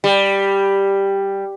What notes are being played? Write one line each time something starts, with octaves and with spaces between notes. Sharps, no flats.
G3